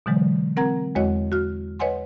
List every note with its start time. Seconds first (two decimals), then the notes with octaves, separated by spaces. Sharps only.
0.06 B2 D3 E3 F#3 G#3
0.57 C4 A#4 F#5 A#5 G#6
0.95 E2 G#3 F#4 C#5 D#5 F#5
1.32 F#4 F6
1.79 B4 C#5 D#5 F#5 G#5 C6